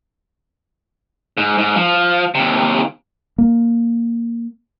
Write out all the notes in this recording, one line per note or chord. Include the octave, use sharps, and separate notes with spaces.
G#2
G#2
F3
D#2 C3
A#3